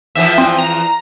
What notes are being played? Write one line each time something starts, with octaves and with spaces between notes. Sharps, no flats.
E2 E3 F3 E5
C4
A#5